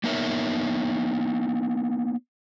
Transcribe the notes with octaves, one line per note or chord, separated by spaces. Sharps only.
A#3 B3 D#4 A#4 C#5 E5